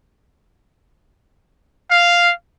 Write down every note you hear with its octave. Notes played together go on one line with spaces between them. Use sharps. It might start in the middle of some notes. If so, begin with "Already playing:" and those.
F5